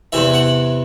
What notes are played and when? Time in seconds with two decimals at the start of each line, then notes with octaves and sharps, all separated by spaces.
0.12 E2 C3 E3 E5
0.34 F#5